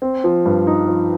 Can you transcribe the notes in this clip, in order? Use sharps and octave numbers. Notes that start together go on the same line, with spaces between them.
C4
F3
G2
D#4
F3